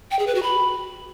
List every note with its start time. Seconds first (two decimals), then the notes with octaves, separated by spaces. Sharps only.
0.11 G5
0.19 G#4
0.27 B4
0.35 F#4
0.43 B5